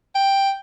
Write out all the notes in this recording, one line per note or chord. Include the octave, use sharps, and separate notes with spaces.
G5